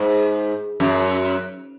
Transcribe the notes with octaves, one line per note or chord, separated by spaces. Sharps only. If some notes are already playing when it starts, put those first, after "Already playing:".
Already playing: G#2
F#2